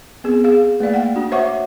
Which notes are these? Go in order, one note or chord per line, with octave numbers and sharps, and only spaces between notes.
B3 C4 G#4
G#4 F5
A3 A#3 D5 F5
F#5 G5
D4 F#4
C5 C#5 E5 F#5 C#6 D6